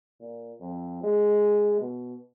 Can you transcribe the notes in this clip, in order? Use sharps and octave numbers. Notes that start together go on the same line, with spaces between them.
A#2
F2
G#3
B2